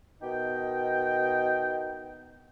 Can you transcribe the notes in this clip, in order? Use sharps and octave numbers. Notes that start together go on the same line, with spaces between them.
B2 D#4 A#4 D#5 G5